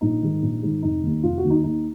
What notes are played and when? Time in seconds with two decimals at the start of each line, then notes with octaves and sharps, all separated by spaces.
0.01 A#1 D#4
0.22 G#2 D#3
0.42 A#1
0.63 G#2 D#3
0.82 F1 D#4
1.03 D#2 D#3
1.23 F1 F4
1.37 F#4
1.44 D#2 D#3
1.50 D#4
1.64 D#2 D#4